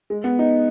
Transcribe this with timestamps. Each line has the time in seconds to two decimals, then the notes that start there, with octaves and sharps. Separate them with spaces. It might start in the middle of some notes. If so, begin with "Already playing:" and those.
0.10 G#3
0.24 B3
0.39 D#4